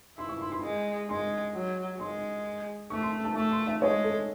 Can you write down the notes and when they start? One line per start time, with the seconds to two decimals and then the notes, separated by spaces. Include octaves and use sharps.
0.18 E4 C6
0.29 C#6
0.41 C6
0.52 C6
0.63 G#3
1.09 G#3 C6
1.54 F#3
2.00 G#3 C6
2.90 A3 C#6
3.02 C6
3.25 A5
3.36 A3 C#6
3.51 C6
3.67 E5
3.81 G#3 C#5
4.04 A4